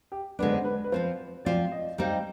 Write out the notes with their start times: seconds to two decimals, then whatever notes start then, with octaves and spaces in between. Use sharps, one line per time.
0.12 G4
0.39 D3 G#3 B3 D4 B4
0.52 C5
0.64 B4
0.84 B4
0.92 F3 C4 F4 C5
1.45 F3 C4 F4 D5
1.72 D#5
1.98 G3 C4 D#4 F5